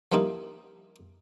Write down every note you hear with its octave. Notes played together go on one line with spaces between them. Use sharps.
F3 G3 A#3 D#4 E4